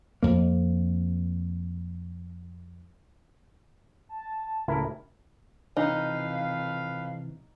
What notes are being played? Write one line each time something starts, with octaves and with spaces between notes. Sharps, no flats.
F2 A#3
A5
C#2 A2 C#3 E4 A4 A#4
F2 C3 E3 D#4 B4 F5